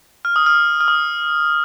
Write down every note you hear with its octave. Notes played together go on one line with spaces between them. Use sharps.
F6
D#6
F6
F6
D#6